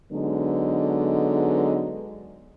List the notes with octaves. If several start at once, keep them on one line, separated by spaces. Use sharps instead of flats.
D3 F#3 G#3 B3 D#4